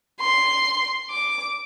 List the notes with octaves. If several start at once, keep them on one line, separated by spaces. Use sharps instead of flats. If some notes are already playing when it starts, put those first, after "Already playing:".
C6
D6